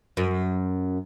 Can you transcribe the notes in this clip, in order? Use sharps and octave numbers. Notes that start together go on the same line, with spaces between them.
F#2